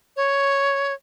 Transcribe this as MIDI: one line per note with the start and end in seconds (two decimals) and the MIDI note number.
0.16 0.93 73